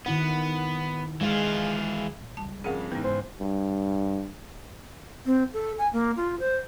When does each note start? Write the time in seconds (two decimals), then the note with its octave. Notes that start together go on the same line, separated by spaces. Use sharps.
0.06 D#3 B3 E4 F#5
1.21 E3 G#3 F4 F5
2.21 A#2
2.37 C#2 G3 A5
2.64 G1 F2 C#3 G#4 A#4 F5 F#5
2.92 C#2 G#2 D#3 E3 B3 D#4
3.04 D#1 G#2 C5
3.40 G2
5.26 C4
5.54 A4
5.78 G#5
5.93 A#3
6.17 F4
6.40 C5